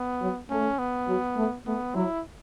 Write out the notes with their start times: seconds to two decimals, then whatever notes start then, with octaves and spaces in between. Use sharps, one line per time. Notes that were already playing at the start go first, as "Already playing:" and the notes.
Already playing: B3
0.21 F#3
0.50 A3 C#4
0.79 B3
1.08 F#3
1.37 A3
1.66 A3 B3
1.95 F#3 E4